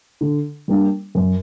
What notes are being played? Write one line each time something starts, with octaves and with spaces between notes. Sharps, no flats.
D3
G3 A#3 D4
F#2